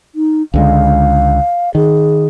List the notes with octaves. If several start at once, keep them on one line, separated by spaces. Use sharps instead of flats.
D#4
C#2 D3 G#3 F5
D#3 G#4